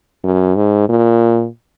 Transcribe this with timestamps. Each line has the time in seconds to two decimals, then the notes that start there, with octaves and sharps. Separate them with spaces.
0.24 F#2
0.56 G#2
0.89 A#2